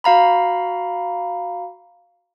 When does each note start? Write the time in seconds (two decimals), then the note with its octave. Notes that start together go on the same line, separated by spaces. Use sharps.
0.04 F#4 F5 A#5 B5